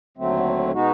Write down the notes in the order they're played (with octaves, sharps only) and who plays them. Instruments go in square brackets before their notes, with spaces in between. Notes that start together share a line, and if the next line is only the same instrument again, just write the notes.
[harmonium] D#2 D3 F#3 A3 C4
B2 G#3 B3 D#4 F#4